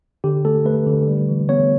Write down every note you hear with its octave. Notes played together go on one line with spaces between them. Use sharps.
D3 G4
A3 A4
A3 B4
D3
G3
E3
B3 C#5